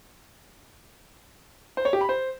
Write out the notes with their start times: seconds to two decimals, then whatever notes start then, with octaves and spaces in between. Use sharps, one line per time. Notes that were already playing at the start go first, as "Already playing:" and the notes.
1.77 C5
1.85 C#5
1.93 G4
2.01 B5
2.09 C5